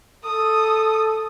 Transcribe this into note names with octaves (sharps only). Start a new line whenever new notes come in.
A4 D#6